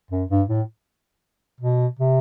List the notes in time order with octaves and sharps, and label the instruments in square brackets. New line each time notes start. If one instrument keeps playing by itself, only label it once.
[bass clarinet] F#2
G2
A2
B2
C3